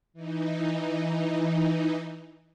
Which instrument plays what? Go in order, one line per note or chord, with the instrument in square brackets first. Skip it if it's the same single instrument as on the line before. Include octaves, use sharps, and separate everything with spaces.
[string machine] E3 D#4